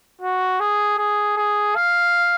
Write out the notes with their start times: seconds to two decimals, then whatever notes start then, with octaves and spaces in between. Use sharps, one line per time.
0.21 F#4
0.60 G#4
0.98 G#4
1.37 G#4
1.75 F5